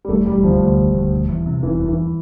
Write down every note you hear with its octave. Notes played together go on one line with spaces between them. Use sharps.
G3
E1 A3
E1 G3
D2 F3
D2
E1
D2
E1
E2
C3
E1 E3
E2
E3